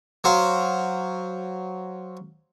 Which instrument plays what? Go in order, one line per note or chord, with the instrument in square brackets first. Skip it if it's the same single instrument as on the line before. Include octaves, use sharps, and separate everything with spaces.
[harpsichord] F#3 C5 F5